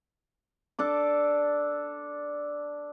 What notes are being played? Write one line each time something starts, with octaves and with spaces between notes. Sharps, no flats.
D4 A4 D6